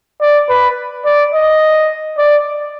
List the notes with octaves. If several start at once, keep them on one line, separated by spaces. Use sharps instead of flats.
D5
B4
D5
D#5
D5